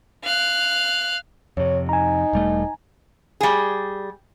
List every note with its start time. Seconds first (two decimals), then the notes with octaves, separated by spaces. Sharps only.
0.24 F5 F#6
1.57 F2 C3 C#5
1.89 D#4 G#5 A#5
2.33 E1 G3 A3
3.41 G3 G#4